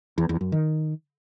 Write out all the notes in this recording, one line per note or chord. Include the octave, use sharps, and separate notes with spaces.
E2
E2
F#2
D#3